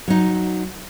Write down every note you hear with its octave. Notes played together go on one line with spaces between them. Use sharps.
F#3 D#4